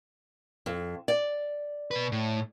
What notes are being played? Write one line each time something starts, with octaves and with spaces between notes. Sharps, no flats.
F2
D5
B2 B4
A2